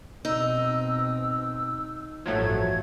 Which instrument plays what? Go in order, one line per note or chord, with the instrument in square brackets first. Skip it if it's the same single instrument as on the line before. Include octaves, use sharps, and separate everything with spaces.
[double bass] B2 C4 [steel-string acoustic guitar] D#4 [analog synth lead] E6
[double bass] A1 G2 [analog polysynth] F3 F#3 A3 [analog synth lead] G#6